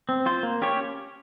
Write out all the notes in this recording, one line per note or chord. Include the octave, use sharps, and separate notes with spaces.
C4
F4 C5
A#3
C#4 G4 C#5